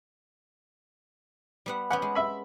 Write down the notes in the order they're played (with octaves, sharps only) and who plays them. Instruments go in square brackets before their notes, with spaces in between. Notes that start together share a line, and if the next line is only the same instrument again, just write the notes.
[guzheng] G3 B3 F#5
[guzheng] B3 C#4 G4 [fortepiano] F#5
[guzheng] G#3
[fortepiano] E5 B5